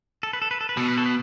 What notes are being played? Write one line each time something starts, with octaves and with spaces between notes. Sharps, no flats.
A4
B4
A4
B4
A4
B4
B2 A4
B4
A4
B4